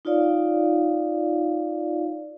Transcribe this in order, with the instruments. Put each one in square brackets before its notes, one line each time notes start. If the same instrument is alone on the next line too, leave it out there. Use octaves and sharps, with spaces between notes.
[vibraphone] D#4 F4 C#5 D5 F5